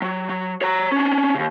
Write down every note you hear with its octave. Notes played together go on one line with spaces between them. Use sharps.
F#3
F#3
C#5 A#5
C#4 D4
D#2 C#3